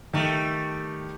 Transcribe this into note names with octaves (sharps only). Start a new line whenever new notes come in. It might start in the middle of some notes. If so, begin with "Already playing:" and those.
D#3 G3 A3